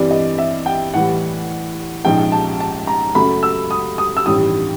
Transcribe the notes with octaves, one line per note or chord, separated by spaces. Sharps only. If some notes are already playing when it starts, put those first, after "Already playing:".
Already playing: G2 E3 G3 C4 D5
D#5
E5
G5
A2 E3 G3 F#5
A#1 G#2 F3 G#3 C#4 G5
A5
A5
A#5
F#2 C#3 F#3 A3 B5
E6
D#6
D#6
E6
A1 G2 D#3 G3 D#6